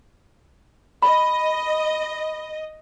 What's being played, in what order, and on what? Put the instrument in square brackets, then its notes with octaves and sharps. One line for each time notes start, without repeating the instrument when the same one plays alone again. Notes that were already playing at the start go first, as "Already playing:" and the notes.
[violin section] D#5 [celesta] B5